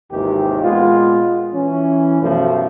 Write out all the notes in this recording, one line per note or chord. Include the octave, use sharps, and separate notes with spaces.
G#1 D#2 C3 D#3 E3 G4
A#2 G#3 B3 F4
E3 C#4
F#2 B2 F3 G3 A3